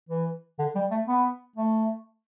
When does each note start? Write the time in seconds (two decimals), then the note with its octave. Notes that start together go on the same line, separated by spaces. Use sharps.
0.09 E3
0.59 D3
0.75 G3
0.91 A3
1.08 B3
1.56 A3